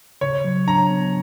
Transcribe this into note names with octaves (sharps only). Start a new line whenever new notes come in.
C#3 C#5
F#3
D4 A#5
B3